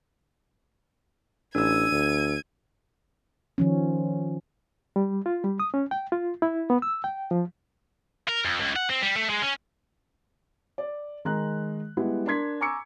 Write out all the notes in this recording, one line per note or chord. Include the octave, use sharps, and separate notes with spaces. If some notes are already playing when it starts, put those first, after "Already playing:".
A1 D4 E6 G#6 D#7
D2
D#3 F3 C#4
G3
F4
G3
D#6
C#4
G5
F4
E4
B3
E6
G5
F3
A#4
F2
C#2
F#5
C4
G3
A3
G#3
C#4
D5
D#3 G#3 A#5 F#6
G3 G#3 B3 E4
D4 A#4 C6 G#6 B6
G#5 A#5 C#6 D6 E6 C#7